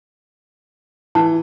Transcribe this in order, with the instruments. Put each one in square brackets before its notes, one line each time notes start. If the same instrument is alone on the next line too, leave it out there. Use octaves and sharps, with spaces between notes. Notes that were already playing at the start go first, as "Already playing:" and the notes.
[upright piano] E3 [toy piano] A5